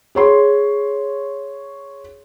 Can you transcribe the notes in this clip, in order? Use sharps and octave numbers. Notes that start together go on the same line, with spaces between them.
G#4 C#5 C6